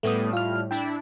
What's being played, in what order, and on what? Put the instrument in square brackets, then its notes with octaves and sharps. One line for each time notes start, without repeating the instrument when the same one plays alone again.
[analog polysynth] A2 G3 [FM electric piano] A3 B3 D#6
[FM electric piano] F4 F6
[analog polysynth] D4 E4 [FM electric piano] G5